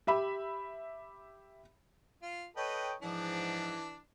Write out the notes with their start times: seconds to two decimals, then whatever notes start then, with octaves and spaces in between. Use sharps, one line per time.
0.07 G4 E5 B5
2.23 F4
2.57 A4 B4 C#5 D#5 G5
3.02 G#2 E3 F3 D4